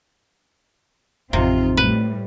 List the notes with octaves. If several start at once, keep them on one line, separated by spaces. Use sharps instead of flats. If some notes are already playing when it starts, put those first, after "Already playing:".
A1 F2 C3 C4 D#4 F4
A2 G3 B4